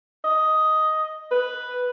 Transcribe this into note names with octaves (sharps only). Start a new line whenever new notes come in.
D#5
B4